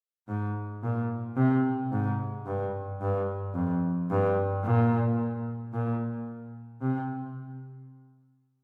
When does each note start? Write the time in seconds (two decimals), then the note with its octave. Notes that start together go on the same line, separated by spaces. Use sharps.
0.28 G#2
0.83 A#2
1.37 C3
1.92 G#2
2.46 G2
3.01 G2
3.55 F2
4.11 G2
4.64 A#2
5.73 A#2
6.82 C3